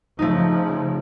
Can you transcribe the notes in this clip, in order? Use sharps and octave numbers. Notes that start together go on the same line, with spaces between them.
C#3 F3 A3 D#4